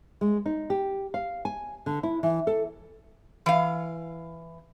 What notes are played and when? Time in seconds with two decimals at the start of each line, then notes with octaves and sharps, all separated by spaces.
0.21 G#3
0.46 D#4
0.70 G4
1.14 F5
1.45 G#5
1.86 D3
2.03 E4
2.23 E3
2.47 A4
3.46 E3 F5